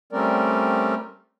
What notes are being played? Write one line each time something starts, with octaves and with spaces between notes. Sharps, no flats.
G3 A3 C4 C#4 A#4 D5